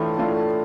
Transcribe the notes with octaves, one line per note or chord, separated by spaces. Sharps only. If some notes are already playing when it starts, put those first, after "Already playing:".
Already playing: A2 E3 A3 D4 F4
A3 D4 F4